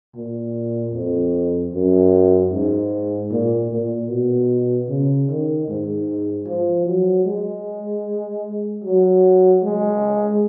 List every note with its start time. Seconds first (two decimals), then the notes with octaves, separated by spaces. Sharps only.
0.15 A#2
0.93 F2
1.73 F#2
2.52 G#2
3.31 A#2
3.70 A#2
4.09 B2
4.88 C#3
5.28 D#3
5.68 G#2
6.46 F3
6.86 F#3
7.25 G#3
8.84 F#3
9.63 G#3